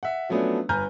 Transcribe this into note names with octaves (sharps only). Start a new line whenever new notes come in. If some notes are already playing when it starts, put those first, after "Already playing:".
E5 F#5
F3 F#3 A3 B3 C#4 D4
G1 B4 G#5 A#5 F6 G6